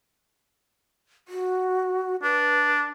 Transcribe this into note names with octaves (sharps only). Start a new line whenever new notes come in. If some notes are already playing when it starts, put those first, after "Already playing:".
F#4
D4 B4